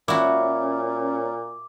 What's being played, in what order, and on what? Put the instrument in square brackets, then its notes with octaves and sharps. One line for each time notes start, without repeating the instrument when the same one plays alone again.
[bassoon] A#2 [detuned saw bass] C#4 [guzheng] E4 F#4 [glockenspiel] D6